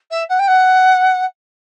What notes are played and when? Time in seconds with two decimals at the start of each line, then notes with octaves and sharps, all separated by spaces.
0.11 E5
0.29 F#5
0.39 G5
0.48 F#5